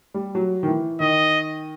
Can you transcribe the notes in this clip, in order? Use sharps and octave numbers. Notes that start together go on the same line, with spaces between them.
G3
F#3
D#3
E3
D#3 D#5